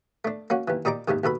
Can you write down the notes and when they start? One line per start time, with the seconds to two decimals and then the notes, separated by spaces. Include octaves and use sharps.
0.25 A3 D4
0.50 A#3 C#4 F#4
0.68 D#2 E3
0.85 A#2 D#4 G4 D5 A#5 D6
1.08 D#2 G#2 C3 D#3
1.24 D#2 B2 A4 B5